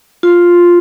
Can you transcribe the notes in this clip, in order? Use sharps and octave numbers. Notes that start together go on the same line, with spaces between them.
F4